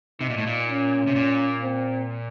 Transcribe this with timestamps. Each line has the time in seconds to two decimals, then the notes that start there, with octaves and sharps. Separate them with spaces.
0.20 C3 D#4
0.30 A#2
0.38 A2
0.47 A#2
0.68 C#4
1.07 C3
1.16 A#2
1.63 C4